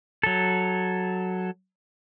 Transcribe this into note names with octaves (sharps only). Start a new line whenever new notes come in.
F#3 A4